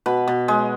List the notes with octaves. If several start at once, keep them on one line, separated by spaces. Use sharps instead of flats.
B2 B4
B2
G#3